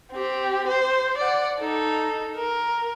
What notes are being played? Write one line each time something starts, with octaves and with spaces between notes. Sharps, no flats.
C4 G4
C5
D5 F#5
D#4 A4
A#4